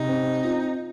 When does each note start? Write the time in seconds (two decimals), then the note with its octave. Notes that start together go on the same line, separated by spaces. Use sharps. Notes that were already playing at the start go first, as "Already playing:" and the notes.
Already playing: C3 D#4
0.09 C4
0.43 F4